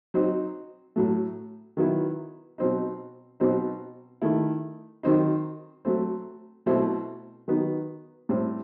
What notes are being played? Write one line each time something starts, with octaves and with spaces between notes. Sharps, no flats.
F#3 C4 D#4
A2 F#3 A3
D#3 F#3 B3 E4
B2 F#3 C4 D#4
B2 F#3 C4 D#4
D#3 A3 E4
D#3 F#3 C4 D#4
F#3 A3 C4
B2 F#3 A3 C4 E4
D#3 F#3 B3 D#4
A2 G3 C4